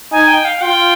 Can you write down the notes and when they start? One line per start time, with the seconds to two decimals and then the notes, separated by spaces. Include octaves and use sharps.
0.12 D#4 G#5
0.28 G5
0.45 F5
0.62 F4 G5